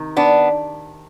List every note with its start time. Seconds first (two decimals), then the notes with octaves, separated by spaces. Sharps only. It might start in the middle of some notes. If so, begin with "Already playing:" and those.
Already playing: C3 D#3
0.17 B3 D4